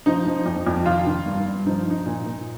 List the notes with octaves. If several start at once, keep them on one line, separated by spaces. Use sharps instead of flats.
F3 D#4
F3
F2
F2
D#3 F4
D#3
G2
G2
F3 D#4
F3 D#4
A#2
A#2